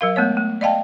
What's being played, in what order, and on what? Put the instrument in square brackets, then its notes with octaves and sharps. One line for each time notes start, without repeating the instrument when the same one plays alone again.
[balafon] F#3 A#4 F5
G#3 A3 B3 C#5
A3
D5 D#5 F5 G5 A5